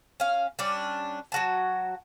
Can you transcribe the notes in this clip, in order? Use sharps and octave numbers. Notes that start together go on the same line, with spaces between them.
C#4 F5
G3 C#4 D4
F#3 F#4 A5